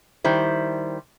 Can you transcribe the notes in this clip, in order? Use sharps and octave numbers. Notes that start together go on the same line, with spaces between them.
D#3 G3 E4 C5